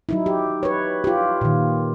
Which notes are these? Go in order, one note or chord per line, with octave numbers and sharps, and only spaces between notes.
F#3 D#4 E4
G4
B4 C#5
F4 G4
A#2 D#3